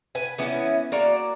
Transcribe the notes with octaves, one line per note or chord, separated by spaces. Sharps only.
B4 G#5
E3 B3 C#4 E4
A#3 F#4 D5 A#5